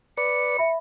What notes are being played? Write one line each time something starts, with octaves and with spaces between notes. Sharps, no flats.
B4 D5 C#7
E5 B5